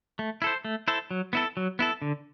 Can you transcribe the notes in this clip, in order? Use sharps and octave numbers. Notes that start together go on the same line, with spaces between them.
A3
E4 A4 C5
A3
E4 A4 C5
F#3
B3 E4 A4
F#3
B3 E4 A4
D3